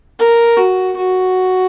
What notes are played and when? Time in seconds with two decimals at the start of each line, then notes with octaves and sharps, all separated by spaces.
0.19 A#4
0.57 F#4
0.96 F#4